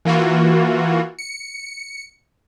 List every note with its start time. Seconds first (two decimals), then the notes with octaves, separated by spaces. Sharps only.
0.05 E3 A#3 F4 F#4
1.19 C#7